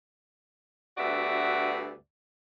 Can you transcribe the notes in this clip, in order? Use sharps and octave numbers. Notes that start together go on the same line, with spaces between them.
D2 G2 B3 F#4 D5 E5